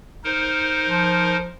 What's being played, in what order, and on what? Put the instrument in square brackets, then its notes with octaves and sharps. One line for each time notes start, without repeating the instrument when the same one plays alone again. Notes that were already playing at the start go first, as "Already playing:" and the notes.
[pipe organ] D#4 A#4 C5
[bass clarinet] F3